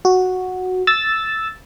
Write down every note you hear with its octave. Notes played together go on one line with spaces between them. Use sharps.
F#4
E6 A6